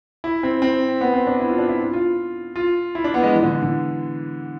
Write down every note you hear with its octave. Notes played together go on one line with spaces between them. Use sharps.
E4
C4
C4
B3
C4
D4
E4
F4
D4
E4
F4
F4
F4
E4
D4
B3
G#3
E3
D3
D3